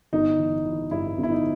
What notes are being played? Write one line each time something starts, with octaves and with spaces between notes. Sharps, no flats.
G1 D#4
E3
E3
G2 E4
G1
E4
D#4